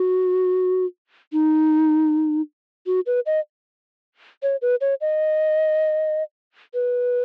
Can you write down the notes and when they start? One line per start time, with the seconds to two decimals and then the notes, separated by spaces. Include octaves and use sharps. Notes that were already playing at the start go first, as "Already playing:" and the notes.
Already playing: F#4
1.33 D#4
2.87 F#4
3.06 B4
3.26 D#5
4.43 C#5
4.62 B4
4.81 C#5
5.01 D#5
6.74 B4